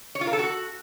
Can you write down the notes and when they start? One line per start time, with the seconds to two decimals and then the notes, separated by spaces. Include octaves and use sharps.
0.15 C#5
0.21 F4
0.27 A#4
0.33 A4
0.39 F#4